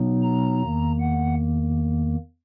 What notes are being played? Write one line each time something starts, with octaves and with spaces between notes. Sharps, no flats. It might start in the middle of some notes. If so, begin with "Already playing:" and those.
Already playing: B2 F#3 B3 D#4
A#5
E2 D#3 A#3
F#5